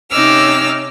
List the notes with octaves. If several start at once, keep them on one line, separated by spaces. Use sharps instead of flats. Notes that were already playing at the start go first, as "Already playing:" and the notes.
C3 C#4 D#4 D6 E6 F6